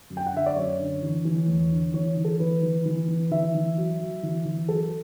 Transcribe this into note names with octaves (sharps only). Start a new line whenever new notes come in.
F#2
G5
F#5
D3 E5
D5
F#2 C#5
D3
E3
E3
E2
D3
E3 C#5
E3
A4
E3 B4
E3
E3
E3
E3 E5
E3
F#3
F#3
E3
E3
F#3 A4